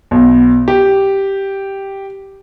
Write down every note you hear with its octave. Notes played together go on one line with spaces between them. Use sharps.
B1
G4